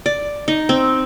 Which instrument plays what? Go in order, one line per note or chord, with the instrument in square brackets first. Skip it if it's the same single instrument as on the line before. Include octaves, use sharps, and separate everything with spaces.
[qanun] D5
D#4
C4